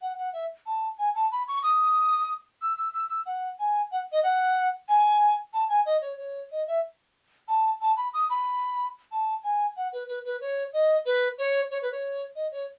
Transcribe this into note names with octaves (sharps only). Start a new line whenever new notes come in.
F#5
F#5
E5
A5
G#5
A5
B5
C#6
D#6
E6
E6
E6
E6
F#5
G#5
F#5
D#5
F#5
G#5
A5
G#5
D#5
C#5
C#5
D#5
E5
A5
A5
B5
D#6
B5
A5
G#5
F#5
B4
B4
B4
C#5
D#5
B4
C#5
C#5
B4
C#5
D#5
C#5